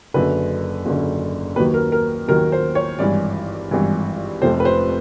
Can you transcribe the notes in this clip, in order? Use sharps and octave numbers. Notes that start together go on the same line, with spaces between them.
F#1 F#2 D3 B4
F#1 F#2 D3
D#2 D#3 F#3 B4
A#4
A#4
D#2 D#3 F#3 A#4
C5
C#5
G#1 G2 E3 D5
G#1 G2 E3
F1 F2 C3 F3 C5
B4
C5